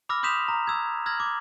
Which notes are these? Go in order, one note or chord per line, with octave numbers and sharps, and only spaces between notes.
B5 D6 E6 F6 A#6
C6 D#6 G6 B6 E7 F7
A#5
E6 G#6
E6 F6 G#6 A#6 F#7
D6